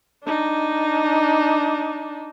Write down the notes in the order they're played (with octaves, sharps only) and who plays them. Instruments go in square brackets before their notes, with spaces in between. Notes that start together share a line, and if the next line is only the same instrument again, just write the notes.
[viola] D4 D#4